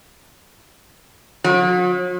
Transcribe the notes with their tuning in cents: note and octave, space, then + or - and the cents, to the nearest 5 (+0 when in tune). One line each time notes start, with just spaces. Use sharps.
F#3 -45